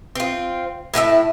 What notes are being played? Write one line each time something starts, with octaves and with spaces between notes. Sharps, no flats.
C4 F4
A2 E4 G#4 E5